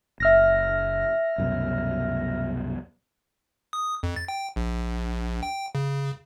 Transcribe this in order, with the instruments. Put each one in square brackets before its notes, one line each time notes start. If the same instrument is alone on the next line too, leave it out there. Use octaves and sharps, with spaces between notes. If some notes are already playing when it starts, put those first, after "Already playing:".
[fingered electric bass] F#1 [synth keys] E5 F6 A#6
[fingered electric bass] C2 F#2 B2
[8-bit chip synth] D#6
F2
A6
G5
A#1
G5
C#3